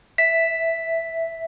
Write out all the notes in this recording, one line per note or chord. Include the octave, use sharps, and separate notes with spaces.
E5 B6